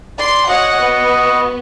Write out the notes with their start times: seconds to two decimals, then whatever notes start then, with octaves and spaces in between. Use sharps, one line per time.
0.19 D5 C6
0.49 F#4 C#5 D#5 F#5 C#6
0.81 B3